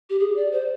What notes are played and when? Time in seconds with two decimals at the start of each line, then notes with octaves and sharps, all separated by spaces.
0.10 G4
0.19 G#4
0.36 D5
0.52 C5